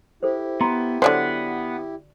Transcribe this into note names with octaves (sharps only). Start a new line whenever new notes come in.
E4 G4 A4 C5
B3 A#5 C6
D3 F#3 B3 C5 D5 F#5